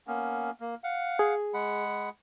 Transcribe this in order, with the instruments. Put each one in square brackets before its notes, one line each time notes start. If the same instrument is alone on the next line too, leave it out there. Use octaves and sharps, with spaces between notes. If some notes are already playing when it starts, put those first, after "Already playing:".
[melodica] A#3 B3 C#4
A#3
F5 F#5
[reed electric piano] G#4
[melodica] G#3 F#5 B5